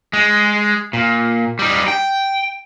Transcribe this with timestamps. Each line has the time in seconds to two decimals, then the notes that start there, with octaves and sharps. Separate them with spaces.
0.13 G#3
0.93 A#2
1.59 G3 D#4
1.88 G5